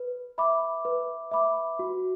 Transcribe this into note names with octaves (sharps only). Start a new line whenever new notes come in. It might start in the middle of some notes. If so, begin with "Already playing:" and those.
Already playing: B4
E5 B5 D6
B4
E5 B5 D6
F#4